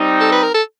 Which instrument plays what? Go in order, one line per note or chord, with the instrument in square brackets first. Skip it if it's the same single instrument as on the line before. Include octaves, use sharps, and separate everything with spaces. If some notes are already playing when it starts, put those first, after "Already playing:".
Already playing: [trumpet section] G3 C4 D#4
[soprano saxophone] A4
B4
A#4
A4